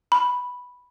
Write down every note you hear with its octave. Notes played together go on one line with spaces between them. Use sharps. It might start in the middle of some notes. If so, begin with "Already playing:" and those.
B5